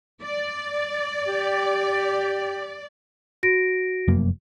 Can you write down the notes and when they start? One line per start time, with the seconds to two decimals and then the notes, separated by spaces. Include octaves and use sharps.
0.22 D5
1.27 G4
3.43 F#4 A#6 D7
4.08 F1 F#2 A#3